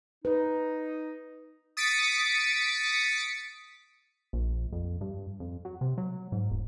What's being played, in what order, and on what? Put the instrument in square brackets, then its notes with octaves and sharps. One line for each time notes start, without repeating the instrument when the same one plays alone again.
[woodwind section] D#4 [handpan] B4
[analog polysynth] D#6 A6 B6 C#7 D7
[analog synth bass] A#1
F2
G2
F2
F#3
C3
F#3
G#2
D#1